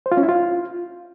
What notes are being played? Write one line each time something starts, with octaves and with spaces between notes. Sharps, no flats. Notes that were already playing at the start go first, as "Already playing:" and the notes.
C5
F4
C#4
E4
F4